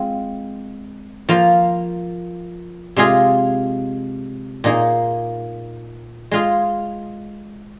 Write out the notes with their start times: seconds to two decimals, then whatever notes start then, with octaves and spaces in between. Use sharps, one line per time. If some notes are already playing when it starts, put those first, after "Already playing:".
Already playing: G#3 C4 F4
1.29 F3 A#3 F4
2.96 C3 G#3 F4 G#4
4.64 A#2 A#3 D#4 G#4
6.31 G#3 F4 G#4